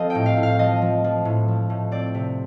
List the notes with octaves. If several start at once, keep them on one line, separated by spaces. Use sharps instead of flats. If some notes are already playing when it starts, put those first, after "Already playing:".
Already playing: F3 C4 G4 A4 D#5 F5
A2 G5
F5
A2
F5
F3 D#5
F3
F3
A2
F3
A2
C4 D5
C3